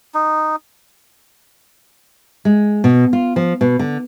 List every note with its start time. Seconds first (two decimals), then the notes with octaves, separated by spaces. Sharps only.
0.14 D#4
2.45 G#3
2.84 B2
3.13 F4
3.36 F3
3.61 B2
3.79 D3